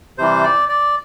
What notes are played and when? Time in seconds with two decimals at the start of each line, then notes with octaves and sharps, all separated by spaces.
0.18 C3 E3 G3 C5
0.43 D5
0.69 D5